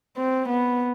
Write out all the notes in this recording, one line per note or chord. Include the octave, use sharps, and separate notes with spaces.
C4
B3